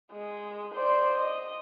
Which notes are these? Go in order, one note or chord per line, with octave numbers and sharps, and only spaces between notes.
G#3
C5 D5
D#5